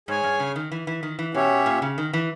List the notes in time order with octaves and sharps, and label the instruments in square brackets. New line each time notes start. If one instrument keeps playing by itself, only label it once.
[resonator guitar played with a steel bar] G#2 [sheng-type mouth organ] G#4 C#5 G#5
[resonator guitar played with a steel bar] G2
C#3
D#3
E3
E3
D#3
E3
[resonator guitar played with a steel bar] B2 [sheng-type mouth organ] C#4 G4 C#5 E5
[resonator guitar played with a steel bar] A#2
C#3
D#3
E3